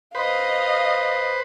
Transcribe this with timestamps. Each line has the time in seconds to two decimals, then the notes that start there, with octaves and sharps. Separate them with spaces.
0.15 B4 C5 D#5 F5